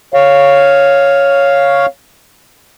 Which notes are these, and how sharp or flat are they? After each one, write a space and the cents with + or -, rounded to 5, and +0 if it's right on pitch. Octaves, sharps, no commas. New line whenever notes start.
C#5 +0 F5 +0